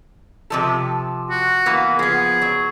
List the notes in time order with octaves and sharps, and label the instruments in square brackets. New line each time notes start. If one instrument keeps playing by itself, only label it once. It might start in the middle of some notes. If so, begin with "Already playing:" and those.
[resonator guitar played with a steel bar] C3 F3 A4
[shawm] F#4
[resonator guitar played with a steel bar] E3 A#3 B3
[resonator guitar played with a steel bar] F3 B3 [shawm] G#4
[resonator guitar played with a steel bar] F#3